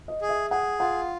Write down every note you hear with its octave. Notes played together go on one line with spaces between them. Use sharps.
D#5
G#4
E5
G#4 F#5
F4 F#5